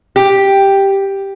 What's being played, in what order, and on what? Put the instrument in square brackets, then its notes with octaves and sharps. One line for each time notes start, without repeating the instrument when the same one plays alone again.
[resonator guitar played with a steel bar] G4